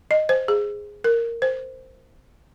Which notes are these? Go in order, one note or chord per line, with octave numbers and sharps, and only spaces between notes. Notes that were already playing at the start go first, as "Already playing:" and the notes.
D#5
C5
G#4
A#4
C5